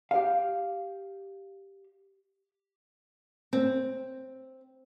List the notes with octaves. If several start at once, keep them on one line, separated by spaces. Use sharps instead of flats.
G4 F5
C4